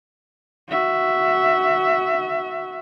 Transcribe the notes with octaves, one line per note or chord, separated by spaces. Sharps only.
F#4 E5